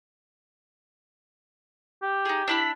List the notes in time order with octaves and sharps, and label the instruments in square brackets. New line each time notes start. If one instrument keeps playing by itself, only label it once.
[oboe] G4
[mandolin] D#4 G#4
D4 E4 B5